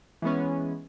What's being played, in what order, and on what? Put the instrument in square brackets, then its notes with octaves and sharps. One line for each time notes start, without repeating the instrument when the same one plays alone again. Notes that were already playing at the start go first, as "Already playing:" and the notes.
[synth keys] E3 G#3 B3 C#4